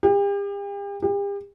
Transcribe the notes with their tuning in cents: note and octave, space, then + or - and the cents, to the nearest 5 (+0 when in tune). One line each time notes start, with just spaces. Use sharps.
G4 +40
G4 +40